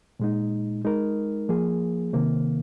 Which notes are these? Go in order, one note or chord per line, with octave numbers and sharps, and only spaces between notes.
A#2 G#3 D#4
G#3 D#4 A#4
F3 A#3 G#4
C3 D#3 A#3